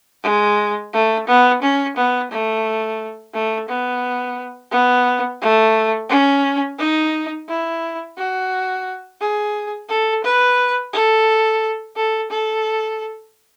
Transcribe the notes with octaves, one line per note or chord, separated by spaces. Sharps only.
G#3
A3
B3
C#4
B3
A3
A3
B3
B3
A3
C#4
D#4
E4
F#4
G#4
A4
B4
A4
A4
A4